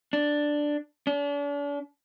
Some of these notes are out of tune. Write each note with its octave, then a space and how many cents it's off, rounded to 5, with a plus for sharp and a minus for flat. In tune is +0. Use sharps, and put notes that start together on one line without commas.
D4 +5
D4 -40